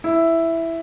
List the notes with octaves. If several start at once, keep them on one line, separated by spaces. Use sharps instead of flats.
E4